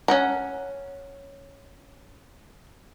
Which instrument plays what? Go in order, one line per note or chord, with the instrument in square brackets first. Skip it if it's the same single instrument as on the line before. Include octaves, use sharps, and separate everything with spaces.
[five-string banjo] C#4 F#5 A#5